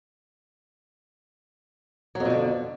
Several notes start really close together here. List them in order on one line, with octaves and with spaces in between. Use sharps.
F#3 F2 B2 D3